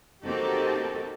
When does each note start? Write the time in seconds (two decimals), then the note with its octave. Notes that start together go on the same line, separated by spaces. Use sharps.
0.23 A#3 C4 D#4 F#4 G4 A4